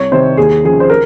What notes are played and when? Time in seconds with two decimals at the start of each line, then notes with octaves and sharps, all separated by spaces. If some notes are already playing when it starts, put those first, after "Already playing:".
Already playing: C2 C#5
0.12 C3 D#3 C5
0.37 D#2 G#4
0.64 C#3 F3 G#4
0.80 C5
0.90 A#4